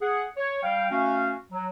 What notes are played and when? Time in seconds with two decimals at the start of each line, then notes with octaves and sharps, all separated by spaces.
0.02 G#4 F#5
0.37 C#5
0.63 G3 F5 G5
0.91 A3 C#4 F#4 F5
1.52 F#3